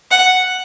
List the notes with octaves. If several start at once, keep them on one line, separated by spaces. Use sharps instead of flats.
F#5